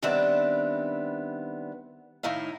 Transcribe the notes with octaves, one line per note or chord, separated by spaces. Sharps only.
D#3 G3 B3 C4 D4 E5
A2 D#3 D#4 E4 F5